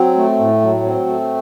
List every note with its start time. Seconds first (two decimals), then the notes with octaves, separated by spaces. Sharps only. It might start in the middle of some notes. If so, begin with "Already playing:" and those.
Already playing: F#3 C4
0.16 A3
0.39 A2
0.61 F#3
0.84 C4
1.06 A3